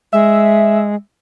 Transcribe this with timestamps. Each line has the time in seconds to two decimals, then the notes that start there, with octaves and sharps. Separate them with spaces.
0.13 G#3 E5